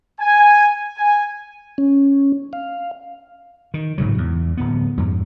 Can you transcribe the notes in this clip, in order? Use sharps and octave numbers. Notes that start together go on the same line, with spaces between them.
G#5
G#5
C#4
F5
D#3
A1 G#2 C#3 F#3
E2
D1 B3
F2 G#2